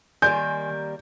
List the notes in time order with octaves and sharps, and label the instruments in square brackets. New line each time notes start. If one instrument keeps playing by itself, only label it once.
[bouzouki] D#3 G3 A#3 [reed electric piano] G#5 C6 [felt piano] G6